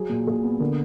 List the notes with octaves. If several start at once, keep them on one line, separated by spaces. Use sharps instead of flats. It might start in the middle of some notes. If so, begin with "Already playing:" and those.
Already playing: F#3 G#4
A#2
A#2 G#4
B3
D3 A#4